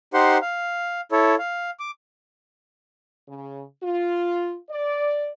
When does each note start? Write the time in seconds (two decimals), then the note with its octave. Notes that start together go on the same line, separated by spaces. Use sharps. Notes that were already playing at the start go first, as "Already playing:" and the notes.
0.14 D#4 G4 C5 F#5 C6
0.42 F5
1.12 E4 A4 C#5
1.39 F5
1.80 D6
3.28 C#3
3.82 F4
4.69 D5